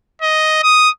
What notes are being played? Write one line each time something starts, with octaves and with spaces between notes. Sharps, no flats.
D#5
D#6